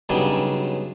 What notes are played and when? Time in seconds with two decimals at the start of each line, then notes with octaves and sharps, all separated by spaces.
0.09 B1 G2 C#3 F#3 G3 G#5